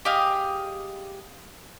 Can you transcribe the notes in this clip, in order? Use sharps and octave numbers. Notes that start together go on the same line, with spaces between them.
G4 G#4 D#5 F5